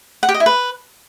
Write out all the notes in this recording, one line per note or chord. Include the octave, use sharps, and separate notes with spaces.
F#5
G4
D#5
E4
B4